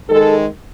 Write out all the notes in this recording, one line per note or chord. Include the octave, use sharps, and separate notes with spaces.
G#2 D#3 G#3 A4